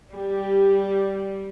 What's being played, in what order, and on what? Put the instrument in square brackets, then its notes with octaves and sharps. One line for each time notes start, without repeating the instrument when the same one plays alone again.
[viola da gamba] G3 [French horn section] G4